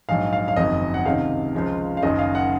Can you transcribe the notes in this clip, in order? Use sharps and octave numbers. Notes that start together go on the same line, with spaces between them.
A#1 G#2 F#3 F5
F5
F5
F#1 F2 D#3 F#3 D#5
F#5
C#2 C3 D#3 F5
C#2 C#3 F3 G#3
F5
F#1 F#2 D#3 D#5
F5
F#5